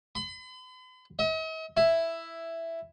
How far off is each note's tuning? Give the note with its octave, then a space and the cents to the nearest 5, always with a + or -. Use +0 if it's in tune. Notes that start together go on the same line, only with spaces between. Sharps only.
B5 +45
D#5 +45
E4 +5